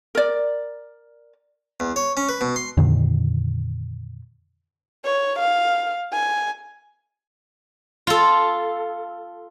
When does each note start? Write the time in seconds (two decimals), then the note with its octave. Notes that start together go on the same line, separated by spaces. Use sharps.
0.15 A#4 D5
1.80 E2
1.96 C#5
2.17 C#4
2.29 B4
2.41 B2
2.56 C6
2.77 F2 A#2 D3 D#3
5.05 C#5
5.39 F5
6.13 G#5
8.07 F4 A4